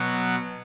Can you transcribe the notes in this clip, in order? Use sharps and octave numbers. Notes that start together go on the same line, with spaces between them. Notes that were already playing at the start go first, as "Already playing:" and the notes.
Already playing: B2 F#3 B3